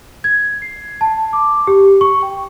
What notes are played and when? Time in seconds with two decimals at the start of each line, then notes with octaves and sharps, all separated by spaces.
0.24 G#6
0.62 C7
1.01 A5
1.33 D6
1.67 G4
2.01 C#6
2.23 G5